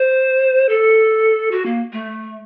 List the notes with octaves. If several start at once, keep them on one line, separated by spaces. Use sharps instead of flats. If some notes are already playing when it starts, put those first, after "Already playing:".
Already playing: C5
A4
F#4
A#3
A3